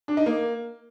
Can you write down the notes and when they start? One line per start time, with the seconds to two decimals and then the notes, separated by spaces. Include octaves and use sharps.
0.08 D4
0.17 D#4
0.26 A#3